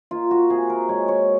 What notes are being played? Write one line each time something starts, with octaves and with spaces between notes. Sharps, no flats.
A#3 F4
F#4
C3 G#4
A#4
G#3 C#5
C#5